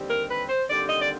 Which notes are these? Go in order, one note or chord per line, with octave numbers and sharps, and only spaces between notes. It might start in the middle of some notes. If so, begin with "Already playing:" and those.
Already playing: D#2 D3 G3 C4
A#4
B4
C5
D#2 D3 G3 C4 D5
D#5
D5